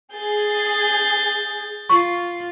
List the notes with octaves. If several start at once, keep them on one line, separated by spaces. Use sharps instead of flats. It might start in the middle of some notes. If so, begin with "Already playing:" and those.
G#4 G6 A6
F4 C#6